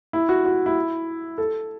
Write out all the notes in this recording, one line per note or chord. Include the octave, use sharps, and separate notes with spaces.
E4
F#4
F#4
E4
A4